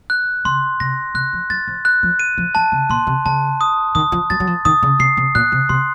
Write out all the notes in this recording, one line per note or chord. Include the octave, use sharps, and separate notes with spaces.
F#6
C#3 C6
C3 A#6
C3 F#6
F3
F#3 A6
F3
F#6
F3
D#7
F3
F3 A5
C#3
A#2 C6
C3
C#3 A5
D#6
D#3 D#6
F3
F#3 A6
F#3
F3
D#3 D#6
C#3
C3 C7
C3
A#2 F#6
C3
C3 C6